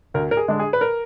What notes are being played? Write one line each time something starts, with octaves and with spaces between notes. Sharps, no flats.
D2 A#4
A#4
G#4
D3 G#3 D4
G#4
B4
A#4